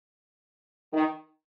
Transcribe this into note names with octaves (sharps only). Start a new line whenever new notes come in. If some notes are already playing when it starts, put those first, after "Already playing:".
D#3